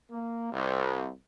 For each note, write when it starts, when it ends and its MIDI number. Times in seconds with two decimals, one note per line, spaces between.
0.11 0.49 58
0.52 1.08 36